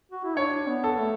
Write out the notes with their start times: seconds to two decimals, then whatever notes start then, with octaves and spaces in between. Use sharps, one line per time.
0.12 F#4
0.24 E4
0.37 D4 C#5
0.68 B3
0.84 A4
1.00 A3